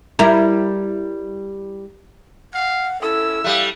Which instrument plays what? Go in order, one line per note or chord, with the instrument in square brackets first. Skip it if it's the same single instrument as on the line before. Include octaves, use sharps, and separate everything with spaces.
[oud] G3 E4 A#4
[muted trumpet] F5 [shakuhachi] F#5
[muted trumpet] C#4 [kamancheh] E4 E6 [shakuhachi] A4
[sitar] G3 A3 [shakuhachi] F5 [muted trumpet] F#5